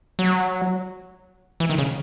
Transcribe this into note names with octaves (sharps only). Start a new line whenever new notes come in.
F#3
E3
D#3
C#3